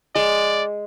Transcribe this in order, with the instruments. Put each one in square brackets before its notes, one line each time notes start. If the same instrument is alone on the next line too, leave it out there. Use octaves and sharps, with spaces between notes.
[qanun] G#3 [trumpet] D5